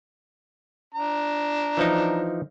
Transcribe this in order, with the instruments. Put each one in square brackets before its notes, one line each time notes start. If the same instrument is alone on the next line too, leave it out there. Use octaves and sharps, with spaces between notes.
[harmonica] D4 A#5
[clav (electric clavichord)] E3 F3 D#4